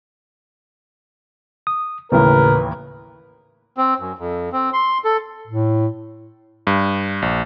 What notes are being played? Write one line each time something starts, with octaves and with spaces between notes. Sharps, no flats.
D#6
A1 D#2 A2 C#3 A#4 B4
C4
F#2
F2
C4
C6
A4
A2
G2
A#1